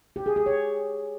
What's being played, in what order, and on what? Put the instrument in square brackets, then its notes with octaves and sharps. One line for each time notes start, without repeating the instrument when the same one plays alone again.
[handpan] G4
G#4
G#4
C#5